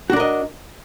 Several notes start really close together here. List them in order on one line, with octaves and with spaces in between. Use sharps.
F#4 D4 A#4 D#5